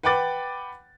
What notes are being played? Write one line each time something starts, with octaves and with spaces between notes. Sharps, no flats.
B4 F#5 G5 B5 D6 A6